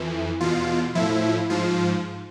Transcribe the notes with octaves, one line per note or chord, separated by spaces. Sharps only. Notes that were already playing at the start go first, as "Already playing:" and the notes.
Already playing: F2 E3
E2 B2 F4
A2 F3 E4
G#2 F3 F4